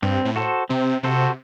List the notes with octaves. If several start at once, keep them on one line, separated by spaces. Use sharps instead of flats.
G2 C4
A2
F#4 A4 C5
C3 C4
C3 F#4 A4 C5